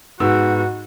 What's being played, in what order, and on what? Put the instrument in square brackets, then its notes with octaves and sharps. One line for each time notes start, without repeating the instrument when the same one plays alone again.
[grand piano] G#2 B3 E6 [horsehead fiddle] F#4